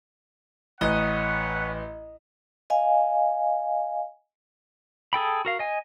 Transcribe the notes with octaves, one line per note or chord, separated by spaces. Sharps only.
A1 B4 C#5 D#5 F#5
D#5 F5 G#5
G#4 A4 G5 B5
F#4 A#4 F5
D#5 G#5